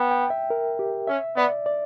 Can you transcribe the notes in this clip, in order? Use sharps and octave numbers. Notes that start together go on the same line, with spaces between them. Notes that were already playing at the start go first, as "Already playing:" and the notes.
Already playing: B3 G5
G5
E5
A#4
G4
C#4 E5
B3 D5
D5